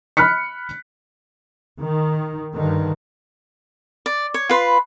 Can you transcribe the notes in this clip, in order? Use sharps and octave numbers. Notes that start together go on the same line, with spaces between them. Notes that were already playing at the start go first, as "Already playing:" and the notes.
B5 F6 F#6 B6 C#7
D#3
G2 D3 D#3
D5
C#5
F4 B4 C6